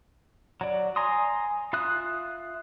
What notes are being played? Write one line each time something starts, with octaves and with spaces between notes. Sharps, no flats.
F#3 D5
G#5 A#5 C6 D#6
F4 E5 D#6 F#6